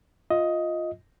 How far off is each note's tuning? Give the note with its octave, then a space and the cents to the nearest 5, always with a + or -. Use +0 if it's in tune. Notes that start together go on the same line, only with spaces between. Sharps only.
F4 +5 D#5 +15